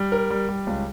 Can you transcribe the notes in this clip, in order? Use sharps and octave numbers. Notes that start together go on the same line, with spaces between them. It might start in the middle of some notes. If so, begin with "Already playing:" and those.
Already playing: G3
A#4
G3
G3
C#2